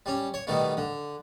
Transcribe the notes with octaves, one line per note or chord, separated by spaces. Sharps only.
G3 C#4
C#5
B2 D#3 G3 A3
D3